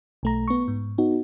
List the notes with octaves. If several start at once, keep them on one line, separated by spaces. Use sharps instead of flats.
B1 A3 A#5
B3 C#6
G#2
B3 D#4 F#4